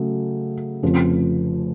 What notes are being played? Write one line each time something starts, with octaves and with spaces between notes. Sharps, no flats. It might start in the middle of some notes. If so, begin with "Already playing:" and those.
Already playing: C#3 F#3 A3
F1 F2 C#3 F3